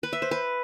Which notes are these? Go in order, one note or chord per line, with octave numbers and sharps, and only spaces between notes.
B4
E5
C5
B4